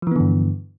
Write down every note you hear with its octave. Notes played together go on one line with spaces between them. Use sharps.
G2 D3 E3 F3 B3